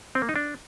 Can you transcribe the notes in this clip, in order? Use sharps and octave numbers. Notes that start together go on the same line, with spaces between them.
C4
A#3
D#4
D4